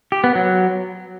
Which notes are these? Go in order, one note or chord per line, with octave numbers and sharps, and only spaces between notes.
G4
B3
F#3